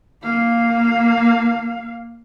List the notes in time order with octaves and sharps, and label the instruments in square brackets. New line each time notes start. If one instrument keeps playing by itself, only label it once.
[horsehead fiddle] A#3 F5